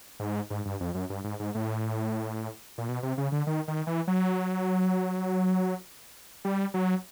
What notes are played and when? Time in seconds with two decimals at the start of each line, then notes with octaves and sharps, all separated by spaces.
0.20 G#2
0.50 G#2
0.65 G2
0.80 F2
0.94 F#2
1.10 G2
1.24 G#2
1.40 G#2
1.55 A2
2.78 A#2
2.89 B2
3.03 C3
3.18 C#3
3.32 D3
3.47 D#3
3.68 D#3
3.87 E3
4.08 F#3
6.45 G3
6.74 F#3